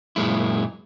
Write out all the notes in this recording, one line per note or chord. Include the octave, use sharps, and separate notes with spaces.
F#2 A#2 G#3 E4